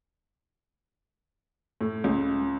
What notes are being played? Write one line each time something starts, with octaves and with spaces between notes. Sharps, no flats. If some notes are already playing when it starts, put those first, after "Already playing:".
A2
C#2